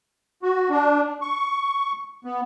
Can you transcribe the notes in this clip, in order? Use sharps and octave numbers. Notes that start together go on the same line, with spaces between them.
F#4
D4
C#6
B3